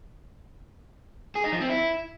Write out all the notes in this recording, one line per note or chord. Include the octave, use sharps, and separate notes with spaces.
G#4
D#4
F3
C4
E4